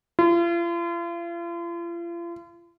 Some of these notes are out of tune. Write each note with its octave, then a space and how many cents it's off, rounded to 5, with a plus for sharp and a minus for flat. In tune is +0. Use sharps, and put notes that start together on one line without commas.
F4 -40